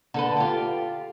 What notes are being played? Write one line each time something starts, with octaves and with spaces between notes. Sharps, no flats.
D3 A4 B4
F4 G4